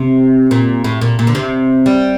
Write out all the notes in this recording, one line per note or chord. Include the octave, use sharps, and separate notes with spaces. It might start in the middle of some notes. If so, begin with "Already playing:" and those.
Already playing: C3
A#2
A2
A#2
A#2
D3
C3
G3